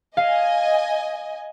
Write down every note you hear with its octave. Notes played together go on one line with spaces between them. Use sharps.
D#5 F5 G#5